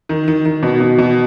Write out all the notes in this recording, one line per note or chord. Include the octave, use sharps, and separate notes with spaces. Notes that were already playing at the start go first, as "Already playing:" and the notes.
D#3
D#3
D#3
B2
B2
B2